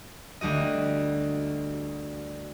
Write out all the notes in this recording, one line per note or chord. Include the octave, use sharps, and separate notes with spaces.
D2 G3 F#4 D#5